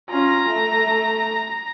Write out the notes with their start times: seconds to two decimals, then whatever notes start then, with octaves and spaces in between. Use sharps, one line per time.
0.10 C#4 F4 A#5
0.49 A3